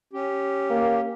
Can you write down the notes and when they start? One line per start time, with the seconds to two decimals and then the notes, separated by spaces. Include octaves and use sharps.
0.13 C#4 G4
0.70 A#3